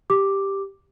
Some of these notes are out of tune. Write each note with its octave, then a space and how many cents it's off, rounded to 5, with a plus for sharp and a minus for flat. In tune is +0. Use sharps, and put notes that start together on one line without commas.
G4 +0 D6 +0